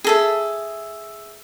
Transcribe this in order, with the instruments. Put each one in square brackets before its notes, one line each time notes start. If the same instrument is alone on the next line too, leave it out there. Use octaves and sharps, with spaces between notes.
[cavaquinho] G#4 A4 E5